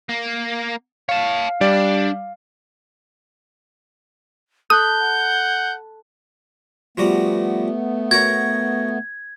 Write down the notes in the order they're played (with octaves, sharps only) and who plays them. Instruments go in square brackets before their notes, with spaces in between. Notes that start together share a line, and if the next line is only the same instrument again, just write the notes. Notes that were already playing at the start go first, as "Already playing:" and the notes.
[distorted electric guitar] A#3
[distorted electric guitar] C#5 A5 [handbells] F5
[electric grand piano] G3 D5 [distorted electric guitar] D4
[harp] A4 B5 F#6 [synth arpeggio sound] D#6 [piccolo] G6
[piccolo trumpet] F#5
[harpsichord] F3 G3 F#4 [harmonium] A3 B3
[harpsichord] F#4 A#4 C#5 [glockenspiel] G#6